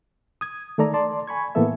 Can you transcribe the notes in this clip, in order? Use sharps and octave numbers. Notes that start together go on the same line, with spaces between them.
D#6 G#6
D#3 A3 A4 D5 A#5
D5 A5 C6
G#5 B5 C#6 G#6
A2 E3 A#3 B3 A4 E5